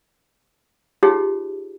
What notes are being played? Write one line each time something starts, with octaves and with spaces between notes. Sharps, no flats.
D#4 F4 G4 G#4 C#5